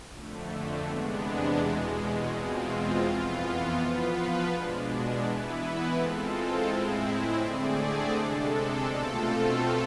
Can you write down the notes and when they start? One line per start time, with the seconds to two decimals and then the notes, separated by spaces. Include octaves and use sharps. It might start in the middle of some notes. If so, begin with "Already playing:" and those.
0.11 F2 D3 A3
0.84 E2 C3 G#3 B3 D4
1.57 E2 B2 G#3
2.30 E2 B2 G#3 C4 F4
3.02 F2 E3 B3 F4
3.75 F3 B3 F4 B4
4.48 B2 G#3 D4
5.21 E3 B3 E4 B4
5.93 G#3 C4 F4 A4
6.66 A2 G#3 C4 E4
7.39 D3 A3 C4 G#4 D5
8.12 C3 G#3 D4 A4
8.84 B2 A3 C4 F4 A4